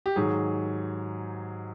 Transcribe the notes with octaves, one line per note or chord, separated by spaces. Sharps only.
G4
G#2 D#3 F#3 G#4